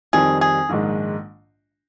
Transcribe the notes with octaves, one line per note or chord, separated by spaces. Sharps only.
F2 D#3 G3 C4 G#4
G#4
A#1 G#2 D#3 G#3